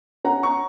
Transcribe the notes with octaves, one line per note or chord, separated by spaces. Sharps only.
C#4 F#5 A#5
A#5 C#6